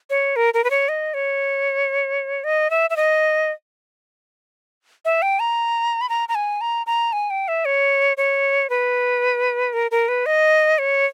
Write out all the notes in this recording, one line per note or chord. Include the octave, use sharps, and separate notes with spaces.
C#5
A#4
A#4
B4
C#5
D#5
C#5
D#5
E5
E5
D#5
E5
G5
A#5
B5
A#5
A#5
G#5
A#5
A#5
G#5
G5
E5
C#5
C#5
B4
A#4
A#4
B4
D#5
C#5